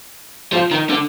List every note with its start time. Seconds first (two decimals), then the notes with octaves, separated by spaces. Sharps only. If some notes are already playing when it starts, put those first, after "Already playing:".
0.53 F3
0.71 D#3
0.89 D3